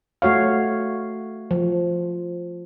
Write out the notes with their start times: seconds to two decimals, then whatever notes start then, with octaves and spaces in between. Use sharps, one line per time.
0.22 A3 F#4 C#5 F5
1.51 F3